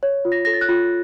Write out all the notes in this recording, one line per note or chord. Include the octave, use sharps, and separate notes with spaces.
C#5
F4
A#6
A4 A#6
A6
F#6
F4